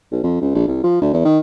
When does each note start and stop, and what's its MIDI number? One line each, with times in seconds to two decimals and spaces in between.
0.12 0.23 35
0.24 0.38 41
0.41 0.54 37
0.55 0.65 34
0.68 0.80 36
0.84 0.99 53
1.01 1.11 38
1.13 1.22 40
1.25 1.39 51